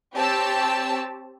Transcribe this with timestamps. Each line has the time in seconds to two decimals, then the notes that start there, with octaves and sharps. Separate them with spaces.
0.15 C4 G4 C#5 A5 E6